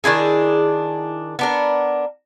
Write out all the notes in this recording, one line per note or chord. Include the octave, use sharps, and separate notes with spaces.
D#3 D4 E4 G#4
B3 D4 A#4